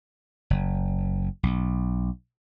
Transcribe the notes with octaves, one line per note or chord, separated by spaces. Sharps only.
F#1
B1